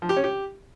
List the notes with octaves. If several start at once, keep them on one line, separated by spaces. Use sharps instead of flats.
F3
G4
C#4
G4